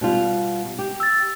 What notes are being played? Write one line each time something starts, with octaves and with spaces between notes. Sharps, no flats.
B2 G3 F4
G4
E6 A6